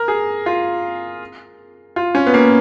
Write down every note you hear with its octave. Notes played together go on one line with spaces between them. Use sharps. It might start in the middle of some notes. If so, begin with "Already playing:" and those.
Already playing: A#4
G#4
F4
F4
C#4
B3
A#3